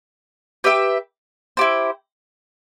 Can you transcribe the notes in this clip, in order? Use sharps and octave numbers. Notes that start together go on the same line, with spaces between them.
G4 B4 E5 G5
E4 G4 C5